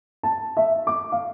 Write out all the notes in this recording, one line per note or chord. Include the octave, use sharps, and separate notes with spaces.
A5
E5
D6
F5